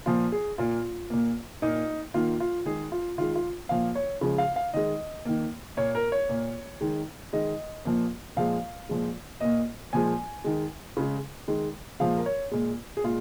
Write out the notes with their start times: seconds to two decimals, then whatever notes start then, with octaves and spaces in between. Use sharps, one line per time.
0.06 A#2 F3 A#3 F4
0.32 G#4
0.58 A#2 A#3 F4
1.10 A#2 A#3
1.62 A#2 A#3 D#4
2.14 D#3 A#3 F4
2.40 F4
2.65 D#3 G#3 G#4
2.92 F4
3.18 D#3 G#3 F4
3.35 F4
3.69 A#2 F3 A#3 F5
3.95 C#5
4.21 C#3 F3 G#3
4.38 F5
4.56 F5
4.74 D#3 G#3 D#5
5.25 D#3 A#3
5.77 A#2 A#3 C#5
5.95 A#4
6.12 C#5
6.29 A#2 A#3
6.81 D#3 G#3
7.33 D#3 G#3 D#5
7.85 A#2 F3 A#3
8.37 A#2 F3 G#3 F5
8.89 A#2 F3 G#3
9.40 A#2 A#3 D#5
9.93 A#2 F3 G#3 G#5
10.44 D#3 G#3
10.97 C#3 G#3
11.48 D#3 G#3
12.00 A#2 F3 G#3 F5
12.17 A#4
12.26 C#5
12.52 A#2 G#3
12.97 G#4
13.04 A#2 G#3 F4